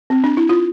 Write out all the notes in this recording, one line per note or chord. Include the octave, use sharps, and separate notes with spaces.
C4
D4
E4
F4